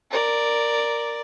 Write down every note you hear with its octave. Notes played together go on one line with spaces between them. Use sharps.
A#4 D5